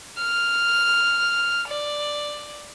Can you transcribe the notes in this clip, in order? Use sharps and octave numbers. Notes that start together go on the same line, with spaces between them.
F6
D5